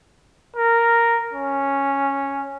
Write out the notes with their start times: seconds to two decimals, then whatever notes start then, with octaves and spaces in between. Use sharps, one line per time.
0.57 A#4
1.33 C#4